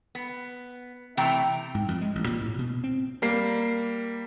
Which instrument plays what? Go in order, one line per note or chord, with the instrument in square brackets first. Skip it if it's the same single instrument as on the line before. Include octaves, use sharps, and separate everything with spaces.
[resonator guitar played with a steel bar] B3
C3 E3 A3 G5 A#5
[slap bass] G#2
F2
G#3
A1
A#2
A2
B2
C4
[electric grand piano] G3 A#3 C7